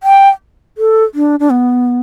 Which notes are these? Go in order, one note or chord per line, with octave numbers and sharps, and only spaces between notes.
G5
A4
D4
D4
B3